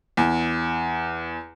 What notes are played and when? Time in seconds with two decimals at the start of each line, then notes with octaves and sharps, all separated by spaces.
0.17 E2